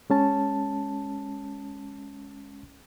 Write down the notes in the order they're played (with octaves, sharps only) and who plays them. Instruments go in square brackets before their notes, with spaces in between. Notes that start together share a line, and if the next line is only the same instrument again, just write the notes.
[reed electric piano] G#3 C#4 A5